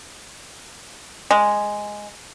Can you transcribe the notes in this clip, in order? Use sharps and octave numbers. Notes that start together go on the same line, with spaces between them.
G#3